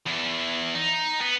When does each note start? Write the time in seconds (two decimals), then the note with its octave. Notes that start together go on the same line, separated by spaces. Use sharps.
0.07 E2
0.75 D#4
1.21 B3